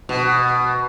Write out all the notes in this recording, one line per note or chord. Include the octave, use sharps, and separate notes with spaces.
B2